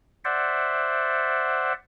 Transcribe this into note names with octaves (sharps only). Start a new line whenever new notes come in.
C5 D5 E5 F#5